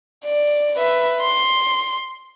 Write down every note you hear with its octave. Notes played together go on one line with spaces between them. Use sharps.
D5
B4 E5
C6